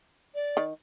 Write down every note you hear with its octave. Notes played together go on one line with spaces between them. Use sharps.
D5
D#3